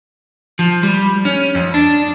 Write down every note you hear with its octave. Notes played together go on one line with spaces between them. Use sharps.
F3
G3
C#4
F2
D4